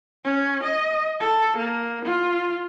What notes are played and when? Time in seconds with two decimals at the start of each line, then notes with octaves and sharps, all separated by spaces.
0.24 C#4
0.63 D#5
1.20 A4
1.57 A#3
2.05 F4